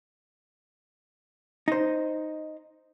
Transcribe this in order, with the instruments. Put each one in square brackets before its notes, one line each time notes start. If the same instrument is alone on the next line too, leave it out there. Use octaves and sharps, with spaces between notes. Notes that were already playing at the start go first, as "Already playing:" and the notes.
[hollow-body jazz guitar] D#4 C5